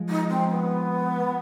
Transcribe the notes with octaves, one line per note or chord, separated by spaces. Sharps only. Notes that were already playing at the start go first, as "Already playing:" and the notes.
Already playing: F3 G#3
D#4
C4
B3